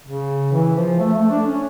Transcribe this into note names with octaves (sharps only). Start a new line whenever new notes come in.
C#3
E3
F3
A3
A3
D4
C#4